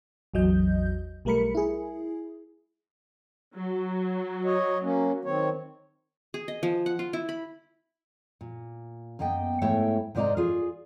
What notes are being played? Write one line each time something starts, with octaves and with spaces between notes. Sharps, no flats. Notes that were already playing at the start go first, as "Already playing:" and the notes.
A1 E2 F#3 D#5 G6
B1 G3 A3 A#4 B5 C#7
E4 G#4
F#3
C#5 D#5
A#3 C#4
D#3 C4 C#5
G#4
D#5
F3
F#5
F4
E4
B5
A#2
F#2 A#3 B3 D#5 G5
G#2 A3 E4 C#5 E5 G5
G#2 C3 C5 D5 D#5 A#5
F4 G#4